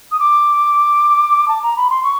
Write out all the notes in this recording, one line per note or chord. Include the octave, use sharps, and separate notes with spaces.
D#6
D6
A5
A#5
B5
C6
C#6